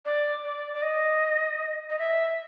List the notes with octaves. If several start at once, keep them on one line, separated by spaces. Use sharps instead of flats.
D5
D5
D5
D#5
D#5
E5